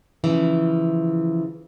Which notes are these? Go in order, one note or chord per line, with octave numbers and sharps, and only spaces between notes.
C#3 E3 F3